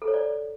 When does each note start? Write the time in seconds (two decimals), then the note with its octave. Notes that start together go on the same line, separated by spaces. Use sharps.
0.02 A4
0.08 C#5
0.14 D5